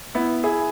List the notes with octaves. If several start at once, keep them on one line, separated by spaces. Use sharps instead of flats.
B3 E4
E4 G#4